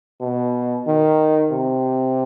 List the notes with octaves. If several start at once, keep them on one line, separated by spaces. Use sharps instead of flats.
B2
D#3
C3